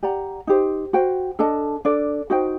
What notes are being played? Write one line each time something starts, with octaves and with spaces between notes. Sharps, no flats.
G4 D5 F#5 A#5
D#4 G4 C5
F#4 C5 G5
D4 A4 D#5 A5
D4 A4 D5
D#4 F#4 C5 G5